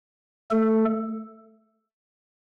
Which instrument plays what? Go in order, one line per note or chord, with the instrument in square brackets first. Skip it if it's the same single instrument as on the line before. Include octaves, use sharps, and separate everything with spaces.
[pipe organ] A3 A4